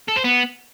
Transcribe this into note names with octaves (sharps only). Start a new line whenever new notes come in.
A4
C5
B3